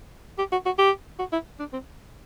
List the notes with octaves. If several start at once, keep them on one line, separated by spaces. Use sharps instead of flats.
G4
F#4
F#4
G4
F#4
E4
D4
C4